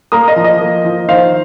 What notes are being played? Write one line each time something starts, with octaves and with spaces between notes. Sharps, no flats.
A#3 A#5 D#6
D#5
F3
D#5
A#3
F3
D#3 C5 F5